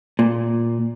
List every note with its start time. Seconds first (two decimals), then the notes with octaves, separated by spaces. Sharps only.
0.19 A#2